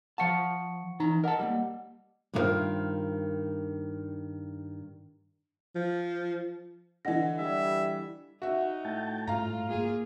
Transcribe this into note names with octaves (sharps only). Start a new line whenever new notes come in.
F3 F5 F#5 A5 C#6 C#7
E3 D#4 A#5
A#4 D#5 F#5 A5
G3 A#3
G2 D#3 D#4 F4 A#4 C5
F3
D3 E3 D#5 F#5 A#6
G3 E5
D#4 F#4 E5
A2 G5 A5
G#2 F4 F5 A#5
A#3 F4 G#4